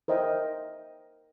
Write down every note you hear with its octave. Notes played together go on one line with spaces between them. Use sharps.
A#4 C5 D#5 E5 G5